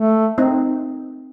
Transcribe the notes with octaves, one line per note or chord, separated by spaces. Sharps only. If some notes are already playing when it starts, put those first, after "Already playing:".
Already playing: A3
C4 D#4